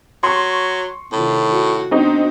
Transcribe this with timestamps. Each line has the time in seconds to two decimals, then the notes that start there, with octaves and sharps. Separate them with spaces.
0.23 F#3 C6 C#6
1.12 A2 C3 D#3 F4
1.52 F#4
1.91 B3 C4 D4 D#4 F#4